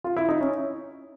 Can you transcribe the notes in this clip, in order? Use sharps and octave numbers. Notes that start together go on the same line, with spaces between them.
F4
E4
D#4
C#4